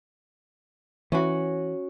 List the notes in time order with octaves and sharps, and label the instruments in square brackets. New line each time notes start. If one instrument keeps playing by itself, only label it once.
[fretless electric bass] E3 [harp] C#4 F#4